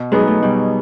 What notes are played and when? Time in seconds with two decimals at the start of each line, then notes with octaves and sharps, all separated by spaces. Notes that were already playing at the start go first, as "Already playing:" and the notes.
Already playing: B2
0.12 F#3 G#3 B3 D#4 G#4
0.28 A3
0.43 B2 G3